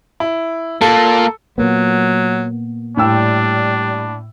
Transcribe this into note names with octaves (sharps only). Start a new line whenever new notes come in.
E4
A#2 A#3 A4
A#2 F#3 A#3 B3
A2 G3 D4 G5 E6